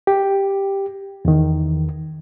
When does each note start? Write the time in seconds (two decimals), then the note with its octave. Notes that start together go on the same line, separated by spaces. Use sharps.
0.07 G4
1.25 E2 D#3